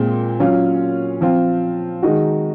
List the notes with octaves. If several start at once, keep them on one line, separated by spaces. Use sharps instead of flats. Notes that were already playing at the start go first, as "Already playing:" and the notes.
Already playing: A#2 G#3 C4
F#3 C#4 F4
F3 C4 F4
D#3 G#3 D#4 F#4